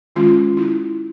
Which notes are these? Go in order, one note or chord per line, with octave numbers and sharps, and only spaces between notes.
D#3 G#3 C#4 F4
E4